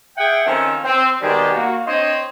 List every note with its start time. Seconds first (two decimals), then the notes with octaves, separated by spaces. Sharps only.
0.17 G#4 E5 F#5 G5
0.46 D#3 F3 C4 C#4 D#4 A4
0.83 C4
1.21 B2 D#3 G3 G#3 G4
1.54 A#3 F#4
1.86 C4 D4 C5 C#5 D#5